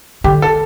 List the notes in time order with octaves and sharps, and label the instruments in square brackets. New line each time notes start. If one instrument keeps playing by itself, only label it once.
[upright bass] D3 [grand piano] G4
[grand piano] A4